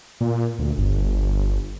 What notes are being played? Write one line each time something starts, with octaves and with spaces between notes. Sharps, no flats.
A#2
D2
G1